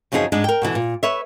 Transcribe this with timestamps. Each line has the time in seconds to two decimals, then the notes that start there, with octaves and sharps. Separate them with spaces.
0.12 F#2 C#3 F3 D#4 F4 G#4
0.32 G#2 G#3 D4
0.44 A#4 G5
0.62 B2 D3 E3
0.75 A#2
1.03 B4 C#5 E5